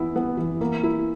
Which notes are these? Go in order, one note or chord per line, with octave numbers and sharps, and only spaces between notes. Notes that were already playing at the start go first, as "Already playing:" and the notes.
Already playing: E3 B3 E4
B3
E3
A#3
E4